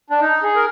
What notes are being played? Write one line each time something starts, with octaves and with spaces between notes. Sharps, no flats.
D4
D#4
G#4
A#4